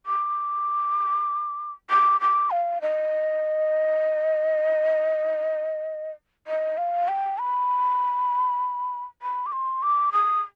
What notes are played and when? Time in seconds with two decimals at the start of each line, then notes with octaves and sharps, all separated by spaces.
0.06 D6
1.90 D6
2.21 D6
2.51 F5
2.82 D#5
6.47 D#5
6.77 F5
7.08 G5
7.38 B5
9.22 B5
9.46 D6
9.52 C6
9.82 D6
10.13 D#6